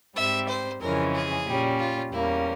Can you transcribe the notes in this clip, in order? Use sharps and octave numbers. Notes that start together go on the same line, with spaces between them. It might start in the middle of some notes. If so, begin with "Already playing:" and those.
G#2 G3 C4 E5
C5
F2 C#3 E3 G#3 C#4 A#4
G#4
A#2 G3 C#4
F4
E2 E3 G3 A#3 C#4 E4